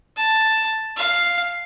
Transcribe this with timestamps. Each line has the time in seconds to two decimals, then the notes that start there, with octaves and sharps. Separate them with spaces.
0.17 A5
0.96 F5